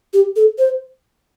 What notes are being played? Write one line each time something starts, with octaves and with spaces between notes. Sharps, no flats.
G4
A4
C5